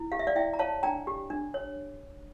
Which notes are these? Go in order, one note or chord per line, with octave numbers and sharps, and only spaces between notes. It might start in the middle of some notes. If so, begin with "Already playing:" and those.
Already playing: E4
G4 F5
E5
D5 F5
E4 E5 G5
A#5
C#5 F5 A5
D4 G5 A#5
G4
D4
C#5